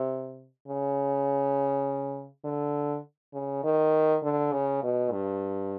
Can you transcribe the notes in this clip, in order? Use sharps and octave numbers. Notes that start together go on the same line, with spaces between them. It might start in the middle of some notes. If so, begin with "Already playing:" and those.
Already playing: C3
C#3
D3
C#3
D#3
D3
C#3
B2
G2